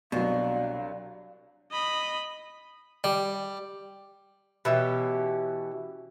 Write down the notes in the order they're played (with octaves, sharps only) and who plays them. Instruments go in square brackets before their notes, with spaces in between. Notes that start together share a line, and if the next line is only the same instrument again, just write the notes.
[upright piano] C2 F#3 [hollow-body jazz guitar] B2 [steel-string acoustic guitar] D4 [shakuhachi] F5
[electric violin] D#5 B5
[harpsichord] G3
[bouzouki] B2 E3 C#4 G4